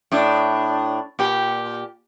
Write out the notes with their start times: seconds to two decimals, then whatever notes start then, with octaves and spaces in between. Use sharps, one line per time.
0.12 A2 D4
1.19 A#2 G4